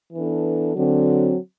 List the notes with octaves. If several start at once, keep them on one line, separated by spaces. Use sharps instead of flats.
E3 B3 D4 A4
D3 F#3 C4